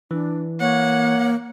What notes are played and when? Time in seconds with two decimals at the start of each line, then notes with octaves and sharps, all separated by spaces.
0.11 E3 D4
0.60 A#3 C#5 F#5